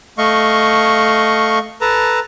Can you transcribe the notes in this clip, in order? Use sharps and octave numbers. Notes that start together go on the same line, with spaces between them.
A3 D#5 F5 C#6
A4 B4 A5 A#5